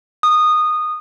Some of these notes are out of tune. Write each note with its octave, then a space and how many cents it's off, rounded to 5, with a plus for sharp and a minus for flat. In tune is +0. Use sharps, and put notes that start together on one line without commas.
D#6 -15